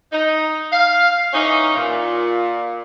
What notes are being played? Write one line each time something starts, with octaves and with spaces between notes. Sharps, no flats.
D#4
F5
E3 C#4 D#4
A#2